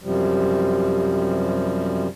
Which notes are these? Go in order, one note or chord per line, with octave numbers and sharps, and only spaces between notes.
F#2 C3 F3 G3